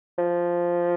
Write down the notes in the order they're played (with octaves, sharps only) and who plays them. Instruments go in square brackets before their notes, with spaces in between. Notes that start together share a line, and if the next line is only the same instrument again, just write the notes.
[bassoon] F3